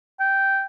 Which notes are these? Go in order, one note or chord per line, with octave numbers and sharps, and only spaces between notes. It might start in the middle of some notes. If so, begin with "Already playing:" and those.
G5